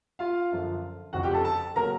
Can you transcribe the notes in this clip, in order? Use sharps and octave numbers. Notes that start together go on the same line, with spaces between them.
F4 F5
F#2 D3 F3
F1 F2 C#3 F3 F#4 F#5
G4 G5
A4 A5
A4 A5
C#3 F#3 A#3 C#4 A#4 A#5